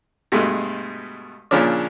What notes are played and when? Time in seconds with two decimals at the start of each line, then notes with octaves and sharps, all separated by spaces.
0.32 G2 B2 G#3 A3
1.51 A#2 C#3 F3 C#4 D4